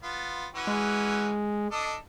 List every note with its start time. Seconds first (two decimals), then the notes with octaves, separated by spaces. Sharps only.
0.03 B3 F4
0.55 E3 C#4 F#4
0.67 G#3
1.71 D4 A4 D#5